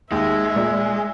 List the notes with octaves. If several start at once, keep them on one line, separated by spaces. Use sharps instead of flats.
D#2 G#3 E5
A#2